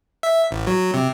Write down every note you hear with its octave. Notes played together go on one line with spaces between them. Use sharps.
E5
A1
F#3
C3